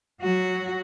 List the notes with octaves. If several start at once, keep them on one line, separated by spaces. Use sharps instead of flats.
F#3 F#4